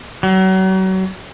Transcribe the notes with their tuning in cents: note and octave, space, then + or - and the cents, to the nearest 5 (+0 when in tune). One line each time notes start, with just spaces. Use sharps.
F#3 +35